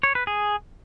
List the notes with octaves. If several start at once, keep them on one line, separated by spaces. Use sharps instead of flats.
C#5
B4
G#4